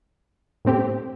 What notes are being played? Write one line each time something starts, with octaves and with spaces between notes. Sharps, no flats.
A2 A3 C4 G4